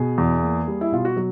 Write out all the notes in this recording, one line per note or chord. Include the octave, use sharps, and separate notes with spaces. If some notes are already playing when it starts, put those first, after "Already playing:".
Already playing: B2 G#4
E2
A#3
G3
E4
B2 F4
F#4
F#3